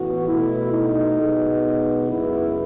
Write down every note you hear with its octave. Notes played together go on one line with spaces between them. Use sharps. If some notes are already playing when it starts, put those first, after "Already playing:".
Already playing: A2 E3 B3 F#4
B2 A3 E4
D#4
B2 G#3 B3
F#2 C#3 G#3 B3 E4